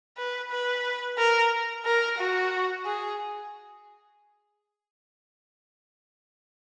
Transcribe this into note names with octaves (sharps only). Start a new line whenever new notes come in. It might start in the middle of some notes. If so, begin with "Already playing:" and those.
B4
B4
A#4
A#4
F#4
G#4